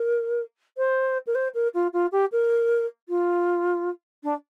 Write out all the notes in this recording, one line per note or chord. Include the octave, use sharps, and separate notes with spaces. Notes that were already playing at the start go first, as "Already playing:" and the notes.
Already playing: A#4
C5
A#4
C5
A#4
F4
F4
G4
A#4
F4
D4